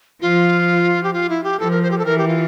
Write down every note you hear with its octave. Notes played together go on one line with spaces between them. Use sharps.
F3 F4
G4
F4
E4
G4
F3 A4
A#4
C5
G4
A4
E3 A#4
G4
F4